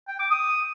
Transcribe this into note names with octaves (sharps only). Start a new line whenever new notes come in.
G5
D6
D#6